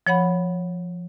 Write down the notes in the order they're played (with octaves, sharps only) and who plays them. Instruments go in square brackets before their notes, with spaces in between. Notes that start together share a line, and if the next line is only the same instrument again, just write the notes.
[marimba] F3 C#5 F#5 B5